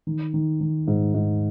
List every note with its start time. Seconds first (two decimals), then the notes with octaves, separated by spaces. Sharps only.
0.07 D#3
0.34 D#3
0.61 D#3
0.88 G#2
1.14 G#2